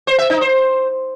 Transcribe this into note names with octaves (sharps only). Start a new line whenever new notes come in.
C5
E5
D#4
C5